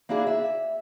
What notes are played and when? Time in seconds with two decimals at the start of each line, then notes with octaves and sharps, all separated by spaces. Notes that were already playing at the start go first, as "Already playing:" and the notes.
0.09 A#3 D4 E4 F#4 G#4
0.27 E5